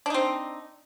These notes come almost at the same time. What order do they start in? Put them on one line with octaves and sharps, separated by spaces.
D4 D#4 C4